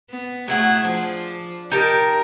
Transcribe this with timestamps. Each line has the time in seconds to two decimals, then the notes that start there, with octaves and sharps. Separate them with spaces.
0.11 B3
0.48 F#3 A3 E4 G#4 F#5
0.85 F3 D4
1.71 D#4 G4 A#4 A5